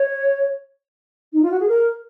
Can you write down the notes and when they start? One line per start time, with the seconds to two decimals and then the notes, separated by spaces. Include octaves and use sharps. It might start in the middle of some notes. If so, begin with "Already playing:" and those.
Already playing: C#5
1.32 D#4
1.42 F4
1.50 F#4
1.59 G#4
1.68 A#4